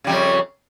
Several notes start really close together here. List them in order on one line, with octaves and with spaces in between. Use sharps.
C#3 G3 F2